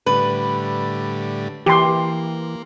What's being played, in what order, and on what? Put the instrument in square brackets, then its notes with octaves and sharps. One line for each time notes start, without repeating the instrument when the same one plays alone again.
[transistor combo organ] A2 D3 G3 [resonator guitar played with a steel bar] B4
[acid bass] E3 [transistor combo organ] A#3 [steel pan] G4 C6